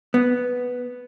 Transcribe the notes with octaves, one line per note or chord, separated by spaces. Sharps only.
B3